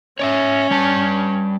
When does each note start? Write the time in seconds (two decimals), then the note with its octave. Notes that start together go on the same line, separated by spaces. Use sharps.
0.19 C#4 C#5 D5 E5
0.71 G3 D5 A5